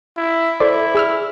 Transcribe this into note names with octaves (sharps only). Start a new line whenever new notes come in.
E4
E4 A4 C5 D5
G#4 E6 F6